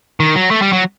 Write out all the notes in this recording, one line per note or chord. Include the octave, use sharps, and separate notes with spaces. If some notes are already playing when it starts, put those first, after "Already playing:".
D#3
F#3
A3
G3
F#3